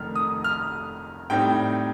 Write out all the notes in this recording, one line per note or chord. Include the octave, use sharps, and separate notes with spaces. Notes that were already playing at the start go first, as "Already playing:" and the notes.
Already playing: F1 F2 D#3 A3 F6
D#6
F6
A2 G3 C4 D#4 G5